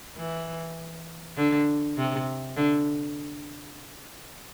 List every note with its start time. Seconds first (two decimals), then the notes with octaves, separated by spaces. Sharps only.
0.16 E3
1.37 D3
1.97 C3
2.57 D3